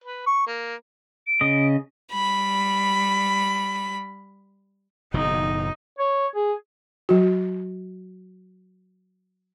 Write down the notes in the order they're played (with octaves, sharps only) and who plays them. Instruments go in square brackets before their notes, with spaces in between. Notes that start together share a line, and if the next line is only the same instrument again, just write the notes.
[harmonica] B4
C#6
A#3
[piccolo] D7
[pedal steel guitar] C#3 D#5
[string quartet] G3 B5
[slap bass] F#1 B2 D#3 [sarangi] D#4
[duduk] C#5
G#4
[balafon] F#3 F#4